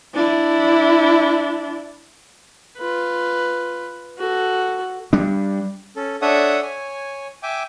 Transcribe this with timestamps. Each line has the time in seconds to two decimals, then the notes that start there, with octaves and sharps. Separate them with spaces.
0.14 D4 E4
2.78 F4 B4
4.18 F#4 A4
5.13 G3 D4
5.96 C#4 A4
6.22 D4 A4 C#5 E5 F#5 D#6
6.62 C#5 G#5
7.43 E5 G5 G#5 D6